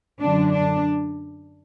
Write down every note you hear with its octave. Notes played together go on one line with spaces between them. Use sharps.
F#2 D3 D4
D4